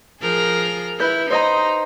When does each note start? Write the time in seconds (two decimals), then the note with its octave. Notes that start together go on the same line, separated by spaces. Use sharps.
0.21 F3 G#4 A#4
1.00 E4 B4 G6
1.30 D#4 C5 D#5 A#5